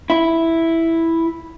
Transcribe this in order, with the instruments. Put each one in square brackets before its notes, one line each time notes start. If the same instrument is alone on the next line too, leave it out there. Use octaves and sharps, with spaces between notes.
[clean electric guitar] E4